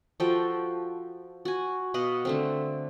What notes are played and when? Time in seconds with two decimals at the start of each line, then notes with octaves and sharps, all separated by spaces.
0.20 F3 F#4 A4 G5
1.45 F#4 G#5
1.94 B2 D#5 F5 F#5
2.25 D3 A3 C4